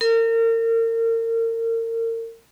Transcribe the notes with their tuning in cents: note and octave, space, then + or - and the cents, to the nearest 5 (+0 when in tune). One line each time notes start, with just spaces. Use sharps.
A#4 -35